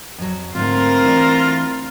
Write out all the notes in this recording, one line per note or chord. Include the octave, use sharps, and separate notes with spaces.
F2 F#3
G#2 D3 A3 C4 F4 A#4
E3 A3 D4